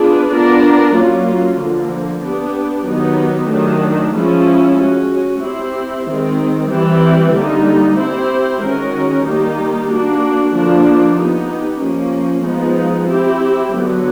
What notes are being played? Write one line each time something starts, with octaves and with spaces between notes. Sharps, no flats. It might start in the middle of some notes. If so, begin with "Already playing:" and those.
Already playing: B3 D4 F4 G#4 B4
B3 D4 F4 A#4 D5
F#3 A#3 C#4 F4
D3 F3 A#3
B3 D4 G4
D#3 F#3 B3 D#4 G4
D#3 F#3 A3 D4
F3 G#3 C#4 E4
G#3 C#4 F#4
C4 E4 G4 C5
D#3 G#3 C4
E3 G3 C4 E4 G4
D3 G3 A#3 D#4
C4 E4 G4 C5
D#3 G#3 C#4 F#4 A#4
D#3 G3 A#3 D#4 G4
A#3 D4 F#4
D3 F3 A#3 D4
B3 D#4 G4
F3 A#3 C#4
F3 G#3 B3 D#4
C4 E4 G4
D3 F#3 B3